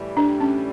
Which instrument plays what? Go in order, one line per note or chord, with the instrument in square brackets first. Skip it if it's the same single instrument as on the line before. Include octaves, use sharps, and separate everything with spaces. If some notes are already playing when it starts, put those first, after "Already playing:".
Already playing: [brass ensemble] A2 E3 G3
[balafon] D4
C#4